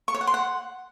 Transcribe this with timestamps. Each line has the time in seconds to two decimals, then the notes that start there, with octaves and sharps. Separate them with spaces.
0.08 C#6
0.14 C#5
0.21 F#5
0.27 C6
0.34 F#5